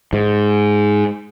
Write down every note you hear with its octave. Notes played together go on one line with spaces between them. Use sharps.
G#2